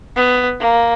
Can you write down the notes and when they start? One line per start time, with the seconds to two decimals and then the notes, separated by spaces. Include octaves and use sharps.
0.16 B3
0.60 A#3